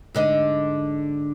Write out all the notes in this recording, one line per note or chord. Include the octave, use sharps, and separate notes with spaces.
G#2 D3 D#5